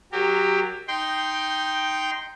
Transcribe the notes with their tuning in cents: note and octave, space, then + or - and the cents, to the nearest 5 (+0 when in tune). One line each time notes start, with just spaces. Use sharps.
F#3 +5 G4 +20 A#4 -25
D#4 +0 G5 +0 C6 -5